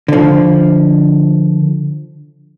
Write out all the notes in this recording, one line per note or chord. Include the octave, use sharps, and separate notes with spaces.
D3 F3